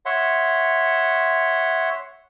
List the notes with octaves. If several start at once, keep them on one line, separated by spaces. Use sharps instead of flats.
C#5 E5 F#5 C6